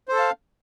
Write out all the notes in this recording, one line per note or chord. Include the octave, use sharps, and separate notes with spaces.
A4 C5 F5 A5